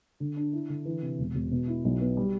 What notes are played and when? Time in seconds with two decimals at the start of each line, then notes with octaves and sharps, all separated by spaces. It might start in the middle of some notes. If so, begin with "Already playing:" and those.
0.20 D3
0.37 D4
0.53 E4
0.69 D3
0.85 E3
1.02 C3
1.19 E1
1.35 E1
1.51 B2
1.67 E4
1.84 B1
2.01 B3
2.17 G3